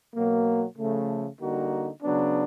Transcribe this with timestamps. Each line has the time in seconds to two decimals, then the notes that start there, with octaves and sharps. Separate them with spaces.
0.15 B2 F#3 A#3
0.78 C#3 F3 A3
1.40 D3 G3 A#3 D#4 F#4
2.02 C#3 F#3 B3 D4